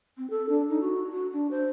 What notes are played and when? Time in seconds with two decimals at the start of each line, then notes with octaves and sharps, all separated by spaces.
0.18 C4
0.30 A4
0.49 D4
0.70 D#4
0.81 F#4
1.12 F#4
1.32 D4
1.51 C5